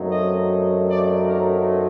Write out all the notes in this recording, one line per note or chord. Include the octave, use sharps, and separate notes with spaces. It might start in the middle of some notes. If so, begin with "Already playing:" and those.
Already playing: F#2 F#3 A3 C4 D#4
D#5
D5
A#4